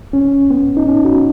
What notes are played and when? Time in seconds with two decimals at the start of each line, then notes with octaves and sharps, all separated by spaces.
0.13 C#4
0.50 B3
0.77 D#4
0.87 C#4
1.05 F#4